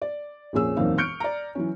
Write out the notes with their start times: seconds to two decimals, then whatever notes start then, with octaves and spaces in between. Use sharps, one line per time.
0.02 D5
0.53 A#1 F2 A#2 C#4 G#4 E6
0.76 E1 F#2 A#2 C4 D#4 F5
0.98 C#6 F6 G6 C#7 D7
1.20 D5 A#5
1.55 E3 F#3 C#4